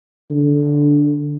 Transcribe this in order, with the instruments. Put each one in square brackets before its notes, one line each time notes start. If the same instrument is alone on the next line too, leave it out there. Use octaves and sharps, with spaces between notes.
[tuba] D3